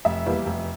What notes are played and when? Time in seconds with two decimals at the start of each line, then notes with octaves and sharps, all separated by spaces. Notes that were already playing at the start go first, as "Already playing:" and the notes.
0.05 F1 E5
0.26 E2 E3 G3 A#3
0.46 F1